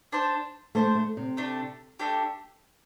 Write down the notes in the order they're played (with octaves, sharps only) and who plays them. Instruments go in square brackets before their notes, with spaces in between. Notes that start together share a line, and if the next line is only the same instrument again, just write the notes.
[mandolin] D4 C5 A5
[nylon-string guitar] A3 [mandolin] D4 C5 A5
[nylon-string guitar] A3
C3
[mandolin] A3 D4 G4
A3 D4 G4